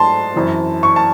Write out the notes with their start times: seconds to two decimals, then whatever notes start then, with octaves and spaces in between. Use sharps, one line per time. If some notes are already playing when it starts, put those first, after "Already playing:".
Already playing: G#2 F#3 A3 D#4 A5 C6
0.34 F#2 E3 C4
0.83 C#6
0.96 A5